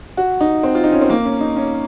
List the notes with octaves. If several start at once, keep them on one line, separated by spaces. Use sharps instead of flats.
F#4
D#4
C4
F4
D#4
C#4
C4
A#3
C#4
D#4
C#4